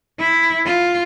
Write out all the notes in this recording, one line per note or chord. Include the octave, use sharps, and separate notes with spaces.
E4
F4